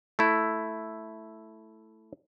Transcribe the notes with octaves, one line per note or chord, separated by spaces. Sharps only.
A3 E4